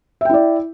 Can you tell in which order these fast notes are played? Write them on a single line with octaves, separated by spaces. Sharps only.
E5 G5 E4 D5